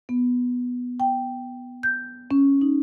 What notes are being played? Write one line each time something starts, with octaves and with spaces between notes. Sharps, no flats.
B3
G5
G6
C#4
D#4